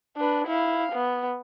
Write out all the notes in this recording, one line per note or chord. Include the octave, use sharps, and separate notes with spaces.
D4 B4
E4 F5
B3